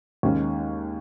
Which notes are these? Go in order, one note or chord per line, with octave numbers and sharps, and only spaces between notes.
D#2 D#3 G#3 C#4